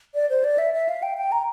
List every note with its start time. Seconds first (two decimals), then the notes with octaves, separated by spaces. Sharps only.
0.14 D5
0.29 C5
0.44 D5
0.58 E5
0.74 E5
0.89 F5
1.02 G5
1.17 G5
1.32 A#5